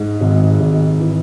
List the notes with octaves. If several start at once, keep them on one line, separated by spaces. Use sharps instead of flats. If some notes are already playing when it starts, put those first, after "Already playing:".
Already playing: G#2
G#1
G#1
E3